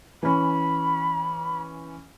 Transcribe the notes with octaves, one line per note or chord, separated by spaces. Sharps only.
E3 C#4 B5